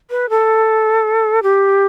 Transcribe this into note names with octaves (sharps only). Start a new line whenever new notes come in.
B4
A4
G4